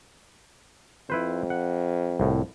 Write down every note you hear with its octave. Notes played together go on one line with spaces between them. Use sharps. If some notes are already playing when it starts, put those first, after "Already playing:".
F2 E4 B4 C5
F#5
C2 A2